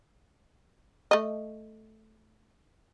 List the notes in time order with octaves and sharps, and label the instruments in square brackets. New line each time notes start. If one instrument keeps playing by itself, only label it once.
[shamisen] A3 D#5